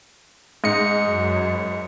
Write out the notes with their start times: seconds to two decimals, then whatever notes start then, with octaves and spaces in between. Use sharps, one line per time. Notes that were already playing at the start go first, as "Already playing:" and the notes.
0.64 G#2 D#5 C#7
1.05 F#2